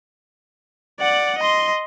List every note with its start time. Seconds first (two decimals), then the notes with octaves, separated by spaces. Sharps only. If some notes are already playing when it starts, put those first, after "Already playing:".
1.00 D5 F#5
1.39 D#5 C6